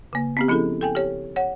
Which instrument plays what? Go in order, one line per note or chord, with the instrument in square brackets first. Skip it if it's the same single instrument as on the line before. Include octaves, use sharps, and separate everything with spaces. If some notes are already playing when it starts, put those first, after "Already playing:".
[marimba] C#3 A#3
B3 C4 G4
F3 C#4 E4 G#4 A4
A4 G5 G#5
G4 C#5
C#5 F#5